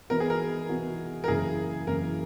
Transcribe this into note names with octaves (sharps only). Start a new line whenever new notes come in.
E3 B3 D#4 F#4 A#4
G#4
A#4
E3 B3 D#4 F#4
A#4
F#2 C#3 E3 A#3 E4 G#4
F#2 C#3 E3 A#3 E4 A#4